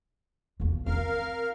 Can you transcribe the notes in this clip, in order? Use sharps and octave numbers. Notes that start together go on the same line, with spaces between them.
E2 A#3
C4 A#4 F5 F6